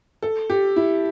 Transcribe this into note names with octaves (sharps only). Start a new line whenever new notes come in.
A4
G4
E4